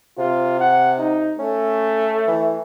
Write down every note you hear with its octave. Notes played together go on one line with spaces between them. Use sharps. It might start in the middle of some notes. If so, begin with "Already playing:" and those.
C3 F4
F#5
D#4
A3 C#4
E3